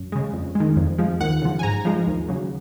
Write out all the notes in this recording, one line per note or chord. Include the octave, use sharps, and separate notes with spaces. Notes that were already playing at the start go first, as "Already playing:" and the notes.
Already playing: F#2
C#3 G#3
F2
D#3 G#3
F2
F3 G#3
D#2 F#5
C#3 F3
G#5
G#2 A#5
F3 G#3
D#2
C#3 F#3